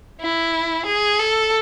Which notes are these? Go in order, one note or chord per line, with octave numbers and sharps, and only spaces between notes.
E4
G#4
A4